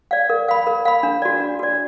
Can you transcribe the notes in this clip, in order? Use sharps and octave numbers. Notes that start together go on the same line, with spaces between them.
D5 F5
A#4
F5 B5
A#4
F5 B5
D4
F#4 D5
D4
F#4 D5